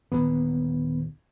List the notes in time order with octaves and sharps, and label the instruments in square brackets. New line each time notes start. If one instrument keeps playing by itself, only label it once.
[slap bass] D#2 A#2 D3 [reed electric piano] B3